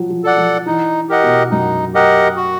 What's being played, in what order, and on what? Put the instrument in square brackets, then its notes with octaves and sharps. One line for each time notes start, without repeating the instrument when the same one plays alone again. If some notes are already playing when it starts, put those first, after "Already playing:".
Already playing: [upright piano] F3 F#3
F3
[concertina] A4 D5 F#5
[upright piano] F3
[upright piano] E3 [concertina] D#4
[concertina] G4 A#4 D#5 F#5
[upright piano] B2
[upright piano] F#2 [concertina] D#4
[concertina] G4 A#4 D#5 F#5
F#4